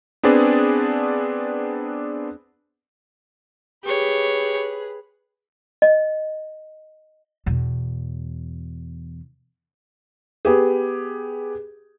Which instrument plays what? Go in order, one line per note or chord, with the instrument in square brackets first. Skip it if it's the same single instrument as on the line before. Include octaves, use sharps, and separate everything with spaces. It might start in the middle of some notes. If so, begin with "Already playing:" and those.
[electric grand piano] B3 C4 D4 G#4 B4 D5
[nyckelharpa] G4 C#5 [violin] G#4 B4
[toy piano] D#5
[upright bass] E2 B2
[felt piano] B3 G4 G#4